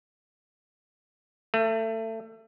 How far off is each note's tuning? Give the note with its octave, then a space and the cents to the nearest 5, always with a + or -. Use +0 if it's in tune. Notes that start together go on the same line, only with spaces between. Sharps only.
A3 +25